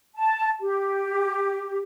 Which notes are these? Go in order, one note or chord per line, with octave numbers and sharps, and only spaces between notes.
A5
G4